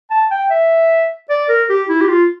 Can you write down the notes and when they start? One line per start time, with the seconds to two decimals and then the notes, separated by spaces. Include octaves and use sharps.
0.10 A5
0.31 G5
0.50 E5
1.30 D5
1.49 A#4
1.69 G4
1.89 E4
2.01 G4
2.09 F4